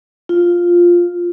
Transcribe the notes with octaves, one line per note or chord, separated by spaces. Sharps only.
F4